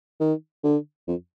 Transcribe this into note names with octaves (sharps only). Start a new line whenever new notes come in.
D#3
D3
F2